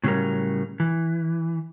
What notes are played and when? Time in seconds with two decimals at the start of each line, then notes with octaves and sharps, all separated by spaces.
0.04 A2 C#3 F#3 G3 C#4 A#4
0.80 E3